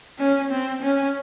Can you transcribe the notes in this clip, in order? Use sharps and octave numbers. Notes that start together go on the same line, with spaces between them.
C#4
C4
C#4